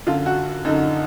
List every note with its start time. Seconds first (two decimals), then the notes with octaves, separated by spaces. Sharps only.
0.07 F#2 D3 F4
0.26 F#4
0.65 F#2 D3 D#4